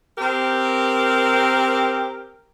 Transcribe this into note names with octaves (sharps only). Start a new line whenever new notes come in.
C4 G4 A#4